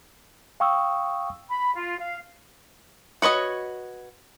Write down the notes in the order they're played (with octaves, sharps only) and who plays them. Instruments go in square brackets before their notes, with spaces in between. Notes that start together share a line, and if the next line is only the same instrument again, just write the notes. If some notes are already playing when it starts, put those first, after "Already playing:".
[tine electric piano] F5 G5 C#6 D#6 E6
[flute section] B5
F4
F5
[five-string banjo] F#4 B4 C#5 D#5